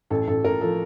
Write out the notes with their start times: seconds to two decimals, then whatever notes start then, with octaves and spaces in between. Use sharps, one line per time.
0.10 A1 A4
0.28 A1 A4
0.44 A1 A#4
0.61 F3 A4